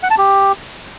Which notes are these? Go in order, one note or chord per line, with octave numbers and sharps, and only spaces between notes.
F#5
A5
G4